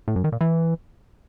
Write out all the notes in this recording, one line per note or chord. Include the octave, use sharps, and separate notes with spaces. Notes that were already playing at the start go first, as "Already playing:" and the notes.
A2
F#2
D#3
A#2
E3